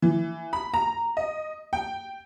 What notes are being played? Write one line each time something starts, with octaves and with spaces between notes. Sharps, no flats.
E3
B5
A#5
D#5
G5